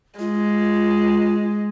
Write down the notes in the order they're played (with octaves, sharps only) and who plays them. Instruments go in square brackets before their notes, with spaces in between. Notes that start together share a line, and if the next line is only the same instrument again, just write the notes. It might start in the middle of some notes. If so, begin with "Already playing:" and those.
[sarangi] G#3 [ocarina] F4